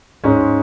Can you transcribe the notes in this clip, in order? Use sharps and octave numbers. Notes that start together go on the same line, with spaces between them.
G#2 G#3 C#4